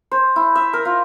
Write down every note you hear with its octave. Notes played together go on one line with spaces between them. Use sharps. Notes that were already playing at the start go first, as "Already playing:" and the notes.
C5
E4
E5
A#4
F4